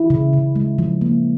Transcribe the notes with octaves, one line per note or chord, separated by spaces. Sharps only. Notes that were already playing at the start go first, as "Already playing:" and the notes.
Already playing: E4
C#3
C#3
G#3
F3
A#3